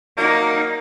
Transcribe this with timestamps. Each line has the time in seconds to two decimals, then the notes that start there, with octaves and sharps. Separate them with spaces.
0.18 F#3 A#3 D#4